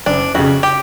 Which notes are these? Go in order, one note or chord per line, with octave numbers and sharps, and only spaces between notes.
F#1 D4
F2 C#3 F#4
G4